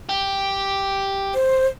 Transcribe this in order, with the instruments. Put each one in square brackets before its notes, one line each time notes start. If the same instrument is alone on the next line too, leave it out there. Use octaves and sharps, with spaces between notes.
[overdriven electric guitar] G4
[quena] C5